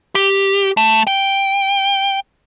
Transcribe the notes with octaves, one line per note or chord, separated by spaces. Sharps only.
G4
A3
G5